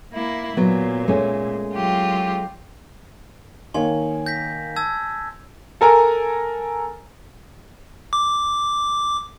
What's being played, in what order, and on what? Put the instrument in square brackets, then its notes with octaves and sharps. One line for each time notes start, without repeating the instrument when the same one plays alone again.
[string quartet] A#3 E4
[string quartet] A#2 [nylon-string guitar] F#3 B3
[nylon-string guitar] G#3 A3 C#4
[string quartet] F#3 F4 G4
[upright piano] D#3 A#3 C#5 [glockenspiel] G#5 C6
[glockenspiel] G6 A#6 B6
A5 E6 G#6
[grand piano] A4 A#4 G#5 A#5
[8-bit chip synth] D6